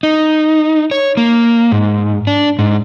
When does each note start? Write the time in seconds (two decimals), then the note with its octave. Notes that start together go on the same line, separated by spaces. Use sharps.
0.03 D#4
0.91 C#5
1.17 A#3
1.71 G#2
2.27 D4
2.59 G#2